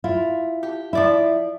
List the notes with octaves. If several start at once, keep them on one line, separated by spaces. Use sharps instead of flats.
E4 F4
G4
F3 E4 D5 E5